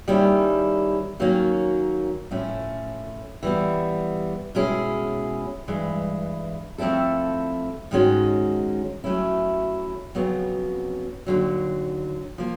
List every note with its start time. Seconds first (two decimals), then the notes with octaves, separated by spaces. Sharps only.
0.07 D#3 G3 A#3 C#4 E4
1.20 D#3 F#3 A#3 C#4
2.31 A2 F3 A3 C#4
3.43 E3 G3 B3
4.55 B2 G#3 C#4 E4 G#4
5.68 G2 E3 G#3
6.78 F3 A3 C4 E4 A4
7.91 G#2 D#3 G#3 C#4 F#4
9.04 F#3 A3 C#4 E4
10.15 F2 C#3 F#3 B3
11.26 D#2 D3 F#3
12.38 F3 A#3